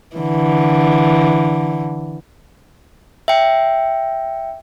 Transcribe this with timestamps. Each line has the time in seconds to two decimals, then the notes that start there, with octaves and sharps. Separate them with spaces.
0.16 D3 E3
3.28 E5 G5